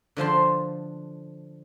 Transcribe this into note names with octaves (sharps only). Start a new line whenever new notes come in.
D3 F3 A5 C6